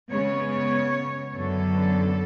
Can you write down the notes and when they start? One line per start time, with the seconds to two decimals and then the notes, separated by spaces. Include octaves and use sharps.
0.11 C#3 G#3 B3 C#5
1.35 F#2 D3 F#3 B3 A4